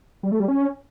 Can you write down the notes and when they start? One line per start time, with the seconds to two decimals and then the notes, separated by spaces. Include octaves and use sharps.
0.23 G3
0.32 A3
0.40 G3
0.48 C#4